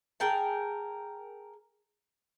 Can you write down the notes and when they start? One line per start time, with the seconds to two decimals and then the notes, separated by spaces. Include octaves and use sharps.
0.20 G#4 A#4 G5 A5